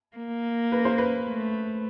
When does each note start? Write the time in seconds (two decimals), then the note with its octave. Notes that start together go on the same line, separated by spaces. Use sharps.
0.17 A#3
0.72 B4
0.85 C5
0.98 B4
1.27 A3